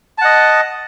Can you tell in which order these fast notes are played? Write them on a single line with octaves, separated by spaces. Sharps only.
A5 F#5 D#5